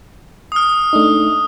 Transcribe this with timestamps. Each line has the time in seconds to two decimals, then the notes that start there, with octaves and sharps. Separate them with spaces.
0.52 D#6 F6
0.93 A3 D4 D#4